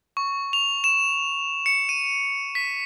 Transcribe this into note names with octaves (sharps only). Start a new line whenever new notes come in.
C#6
F7
E7
C#7
D#7
B6